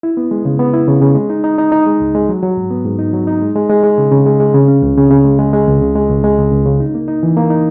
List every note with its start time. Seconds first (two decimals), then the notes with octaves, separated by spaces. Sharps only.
0.03 E4
0.17 B3
0.31 G#3
0.45 C#3
0.59 B3
0.74 E4
0.88 C#3
1.02 C#3
1.15 G#3
1.30 D#4
1.44 D#4
1.58 D#4
1.72 D#4
1.86 G#3
2.00 C#2
2.15 G#3
2.29 F#3
2.43 F#3
2.57 G#2
2.71 B3
2.85 G#2
2.99 D#4
3.13 F#3
3.27 D#4
3.42 G#3
3.56 G#3
3.70 G#3
3.83 G#3
3.98 C#3
4.11 C#3
4.26 G#3
4.40 G#3
4.54 C#3
4.68 C#4
4.82 C#2
4.97 C#3
5.11 C#3
5.25 G#3
5.39 G#3
5.53 G#3
5.67 C#2
5.81 C#3
5.95 G#3
6.10 C#2
6.24 G#3
6.38 C#2
6.52 C#2
6.66 C#3
6.80 D#4
6.95 A#3
7.08 D#4
7.23 E3
7.37 A#3
7.50 D#4